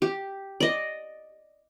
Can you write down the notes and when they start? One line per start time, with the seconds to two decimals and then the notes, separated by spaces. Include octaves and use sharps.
0.02 G4
0.60 D5 D#5